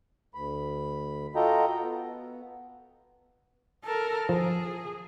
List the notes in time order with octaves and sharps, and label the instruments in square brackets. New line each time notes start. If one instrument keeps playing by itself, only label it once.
[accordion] D2 B5
F4 F#4 A4 D#5 G5 A#5
B3
[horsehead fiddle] A4 A#4
[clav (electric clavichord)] F3 [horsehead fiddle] G#4